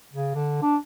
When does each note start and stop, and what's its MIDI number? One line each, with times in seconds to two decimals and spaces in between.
0.13 0.34 49
0.35 0.58 50
0.62 0.76 62